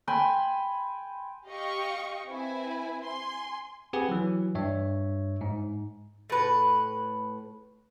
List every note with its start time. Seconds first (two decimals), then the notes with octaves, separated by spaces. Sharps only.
0.07 G5 G#5 B5 C6
1.47 G4 D#5 F5 G5 C#6
2.28 C4 E4 B4 G#5
3.03 G#5 C6
3.93 C4 G4 G#4 B4 F#5 G#5
4.09 E3 F#3
4.55 G2 C#5 E5
5.41 G#2
6.30 A2 B4